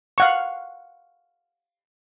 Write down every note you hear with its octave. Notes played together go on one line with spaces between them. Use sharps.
F5 F#5 C#6